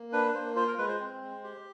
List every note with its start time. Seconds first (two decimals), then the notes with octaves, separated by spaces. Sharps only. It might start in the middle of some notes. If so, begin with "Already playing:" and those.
Already playing: A#3
0.12 D4 B4
0.35 A#3 C5
0.56 F4 C5
0.68 A#4
0.78 G#3 B4
0.88 C5
1.00 C4
1.22 G#3
1.44 G4